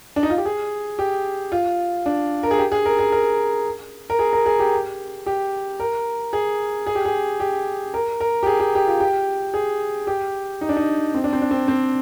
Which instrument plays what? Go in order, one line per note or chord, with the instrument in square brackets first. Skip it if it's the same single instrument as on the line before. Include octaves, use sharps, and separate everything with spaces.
[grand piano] D4
D#4
F4
G4
G#4
G4
F4
D4
A#4
G#4
G4
G#4
A#4
G#4
A#4
A#4
G#4
A#4
G#4
G4
G4
A#4
G#4
G#4
G4
G#4
G4
A#4
A#4
G4
G#4
G4
G4
F4
G4
G#4
G4
D#4
D4
D#4
C4
D4
C4
D4
C4
C4